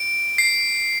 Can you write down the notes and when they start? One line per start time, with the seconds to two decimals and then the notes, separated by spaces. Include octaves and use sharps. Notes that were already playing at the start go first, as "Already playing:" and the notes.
Already playing: D7
0.38 C7